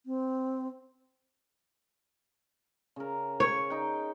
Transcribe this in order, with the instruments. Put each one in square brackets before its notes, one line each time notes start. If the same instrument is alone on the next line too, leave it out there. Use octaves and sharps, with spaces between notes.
[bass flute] C4
[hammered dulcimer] C#3 A#4
[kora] C#5
[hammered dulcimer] D#4 G5